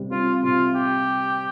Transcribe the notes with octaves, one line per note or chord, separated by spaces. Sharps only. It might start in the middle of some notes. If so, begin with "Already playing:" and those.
Already playing: C3 G3
C4 F4
C3 F4
G4